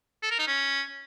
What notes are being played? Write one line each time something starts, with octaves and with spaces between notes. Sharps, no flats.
A4
A#4
D#4
C#4